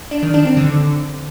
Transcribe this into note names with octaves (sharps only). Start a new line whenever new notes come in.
D4
D#3
D4
C4
D3